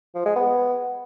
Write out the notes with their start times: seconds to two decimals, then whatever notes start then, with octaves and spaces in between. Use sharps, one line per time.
0.15 F3
0.26 G#3
0.36 B3